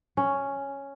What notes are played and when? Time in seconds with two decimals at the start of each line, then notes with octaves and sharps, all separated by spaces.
0.17 C#4